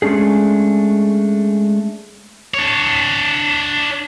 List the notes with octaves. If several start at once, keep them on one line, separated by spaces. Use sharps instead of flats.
G#3 A3 C#4 D4 G#4
D4 C#5